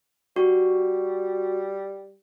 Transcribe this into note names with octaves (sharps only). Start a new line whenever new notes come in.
G3 F#4